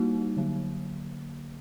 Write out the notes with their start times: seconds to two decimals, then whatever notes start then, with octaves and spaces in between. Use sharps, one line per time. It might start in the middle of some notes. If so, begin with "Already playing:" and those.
Already playing: G3 A#3 D#4 F#4
0.37 D3 F#3 A#3